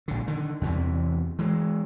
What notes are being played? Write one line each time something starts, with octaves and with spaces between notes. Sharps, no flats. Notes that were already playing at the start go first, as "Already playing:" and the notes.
A#1 D3
D3 D#3
E2 C3 E3
E3 G#3